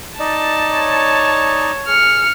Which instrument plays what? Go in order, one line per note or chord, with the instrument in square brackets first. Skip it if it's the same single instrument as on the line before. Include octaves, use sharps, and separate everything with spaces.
[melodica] D#4 D5 D#5 [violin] A5
[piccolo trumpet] C#5
[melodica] G#4 [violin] F6 C#7